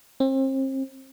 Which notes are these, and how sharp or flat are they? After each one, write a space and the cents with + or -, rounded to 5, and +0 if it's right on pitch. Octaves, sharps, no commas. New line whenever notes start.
C4 +35